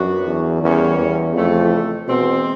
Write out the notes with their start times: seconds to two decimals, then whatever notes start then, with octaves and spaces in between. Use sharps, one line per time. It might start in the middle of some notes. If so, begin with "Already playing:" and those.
Already playing: F#2 F#3 B3 D4 F#4 B4
0.26 E2
0.61 E2 G3 A#3 C#4
0.98 E2
1.35 F2 C#3 E3 A3
2.08 B2 E3 G#3 C4